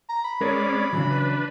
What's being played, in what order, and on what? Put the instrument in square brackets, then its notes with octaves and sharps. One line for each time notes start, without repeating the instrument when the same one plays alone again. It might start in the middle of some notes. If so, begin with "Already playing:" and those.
[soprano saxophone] A#5
B5
[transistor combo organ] G#3 C#4 D5 [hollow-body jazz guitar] A#4 C#5
[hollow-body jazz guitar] C4
[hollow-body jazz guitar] C#3 E3 F#3 [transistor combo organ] D4
[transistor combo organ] D4 B4